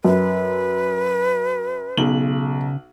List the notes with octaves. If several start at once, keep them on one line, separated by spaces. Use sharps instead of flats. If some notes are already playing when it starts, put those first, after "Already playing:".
F#2 B4
B1 C#3 F#7